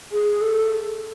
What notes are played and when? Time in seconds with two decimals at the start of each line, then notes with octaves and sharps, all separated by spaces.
0.12 G#4
0.41 A4